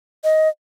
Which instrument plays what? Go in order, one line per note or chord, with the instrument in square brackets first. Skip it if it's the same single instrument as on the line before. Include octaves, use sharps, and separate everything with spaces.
[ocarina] D#5